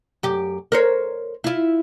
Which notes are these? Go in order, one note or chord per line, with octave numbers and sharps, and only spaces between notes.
F#2 G4
A#4 C5 C#5
E4 F4